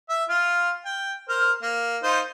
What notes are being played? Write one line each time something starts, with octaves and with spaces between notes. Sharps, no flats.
E5
F4 F6
G5
A#4 C5 F6
A#3
D#4 F4 C5